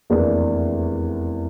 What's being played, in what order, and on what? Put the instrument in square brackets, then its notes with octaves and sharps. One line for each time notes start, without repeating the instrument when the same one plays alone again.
[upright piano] F1 E2 E3 A#3 D4